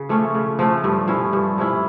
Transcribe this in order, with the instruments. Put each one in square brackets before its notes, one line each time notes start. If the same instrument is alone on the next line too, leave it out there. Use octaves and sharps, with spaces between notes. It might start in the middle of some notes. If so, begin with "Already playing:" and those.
Already playing: [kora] C#3
F3 A3 C#4
C#3
F3 A3 C#4
G2
F3 C#4 E4
G2
F3 C#4 E4